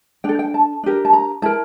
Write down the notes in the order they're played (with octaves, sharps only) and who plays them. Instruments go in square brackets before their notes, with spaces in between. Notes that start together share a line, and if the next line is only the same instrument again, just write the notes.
[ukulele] D4 A4 G5
G5
A5
D4 G4 A#4
A5
A#5
E4 A#4 A5